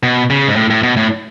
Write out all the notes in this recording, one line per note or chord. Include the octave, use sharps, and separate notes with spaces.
B2
C#3
G#2
A2
A2
B2
A2